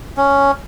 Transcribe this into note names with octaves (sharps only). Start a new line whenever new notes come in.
C#4